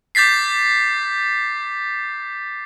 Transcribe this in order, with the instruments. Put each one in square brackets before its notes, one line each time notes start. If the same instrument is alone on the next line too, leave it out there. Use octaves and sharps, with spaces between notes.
[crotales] D6 G6 A6 B6 C7